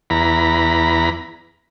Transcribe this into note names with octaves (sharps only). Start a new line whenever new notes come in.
E2 A#5 B5